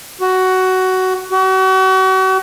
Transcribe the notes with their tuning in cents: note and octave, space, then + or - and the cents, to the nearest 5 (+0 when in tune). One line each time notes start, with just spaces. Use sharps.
F#4 +15
F#4 +40